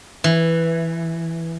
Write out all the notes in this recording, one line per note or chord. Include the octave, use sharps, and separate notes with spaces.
E3